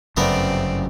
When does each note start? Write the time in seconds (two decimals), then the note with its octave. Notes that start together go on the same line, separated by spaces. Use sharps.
0.17 G1 F#2 C#3 A3 B3 C4 A#4 D5